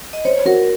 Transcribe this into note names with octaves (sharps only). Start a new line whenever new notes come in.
D#5
C5 C#5
F#4 A#4